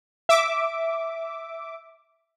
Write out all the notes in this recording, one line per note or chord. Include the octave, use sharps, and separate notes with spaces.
E5 D6